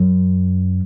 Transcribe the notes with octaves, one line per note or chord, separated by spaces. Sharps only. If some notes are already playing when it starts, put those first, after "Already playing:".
Already playing: F#2